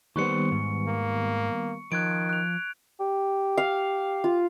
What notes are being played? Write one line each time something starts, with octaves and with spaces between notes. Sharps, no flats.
D#3 G3 A#3 B3 B4 C5 C#6 C#7
G#2
A#3
D#3 F3 F#6 G#6 D7
F#6 F7
G4
F5
F4